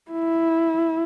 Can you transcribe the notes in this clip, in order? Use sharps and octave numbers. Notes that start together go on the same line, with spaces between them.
E4